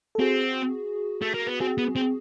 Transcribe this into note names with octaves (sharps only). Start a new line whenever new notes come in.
A4
C4 F#4 G#4
A3
A#3
B3
C4 F#4 G#4
B3
C4